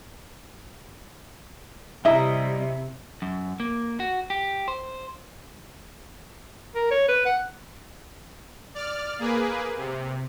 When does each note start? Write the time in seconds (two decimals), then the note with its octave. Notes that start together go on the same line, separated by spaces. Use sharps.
2.05 C3 G3 E4 D#5 E5 A#5 D#6
3.22 F#2
3.60 A#3
4.00 F#4
4.30 G4
4.68 C5
6.75 A#4
6.91 C#5
7.08 B4
7.25 F#5
8.74 D5 F6
9.19 A#3 G#4 B4
9.77 C3